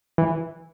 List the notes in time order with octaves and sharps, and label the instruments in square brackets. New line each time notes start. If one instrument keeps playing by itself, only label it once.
[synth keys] E3